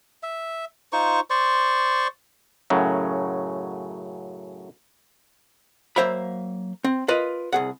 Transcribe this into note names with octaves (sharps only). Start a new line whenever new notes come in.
E5
D#4 F4 C5 C#6
C5 D5 C6 C#6
F#2 A2 C#3 F#3
F#3 A#3 C5 E5 F5 B5
C4
F4 A#4 B4 D#5
C2 G#4 F#5